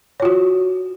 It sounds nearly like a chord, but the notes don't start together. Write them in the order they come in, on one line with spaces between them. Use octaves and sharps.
C#5 F4 F#4